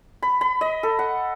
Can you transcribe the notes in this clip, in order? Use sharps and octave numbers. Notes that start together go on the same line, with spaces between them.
B5
B5
D#5
A4
F#5